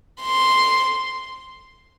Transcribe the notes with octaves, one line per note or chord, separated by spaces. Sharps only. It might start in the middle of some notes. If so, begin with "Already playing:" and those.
C6